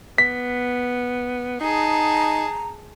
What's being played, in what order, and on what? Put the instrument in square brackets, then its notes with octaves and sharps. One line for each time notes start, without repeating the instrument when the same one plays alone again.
[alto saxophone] B3 [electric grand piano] B6
[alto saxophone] D#4 [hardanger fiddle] G#4 A5 [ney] A#5